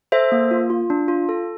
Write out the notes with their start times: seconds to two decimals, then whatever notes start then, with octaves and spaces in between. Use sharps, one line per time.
0.12 A4 C5 E5
0.32 A#3
0.51 F4
0.70 F4
0.90 D4
1.08 F4
1.29 A4